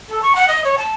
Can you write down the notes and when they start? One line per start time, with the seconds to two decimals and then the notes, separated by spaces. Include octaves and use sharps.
0.09 A4
0.22 C#6
0.35 F#5
0.48 D#5
0.64 C#5
0.78 A5